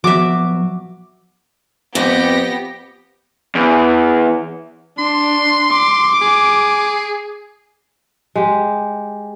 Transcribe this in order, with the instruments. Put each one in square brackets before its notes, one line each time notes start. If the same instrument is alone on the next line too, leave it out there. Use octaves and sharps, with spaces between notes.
[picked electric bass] F3 F#3 B3 [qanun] F#4 E5 [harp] D6
[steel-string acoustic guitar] F2 [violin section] B3 G4 A#6
[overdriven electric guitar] E2
[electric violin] D4 [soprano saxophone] C6
[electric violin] D6
[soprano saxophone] G#4
[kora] G#3 G4